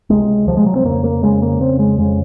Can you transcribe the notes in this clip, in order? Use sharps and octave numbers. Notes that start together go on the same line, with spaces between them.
C#2 C3 G#3
C#2 C3 F3
G#3
F#3
C4
F2 C#3 A#3
A#3
F2 C#3 G#3
A#3
F2 C#3 C4
G#3
F2 C#3 G#3